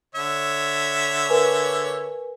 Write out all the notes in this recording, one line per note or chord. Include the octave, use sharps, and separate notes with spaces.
D3 C#5 E5
A#4 B4 G#5